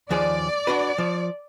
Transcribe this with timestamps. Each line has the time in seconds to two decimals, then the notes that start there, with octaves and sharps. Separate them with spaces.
0.11 D#2 F3 G#4 D5
0.67 D4 F#4 B4
0.98 F3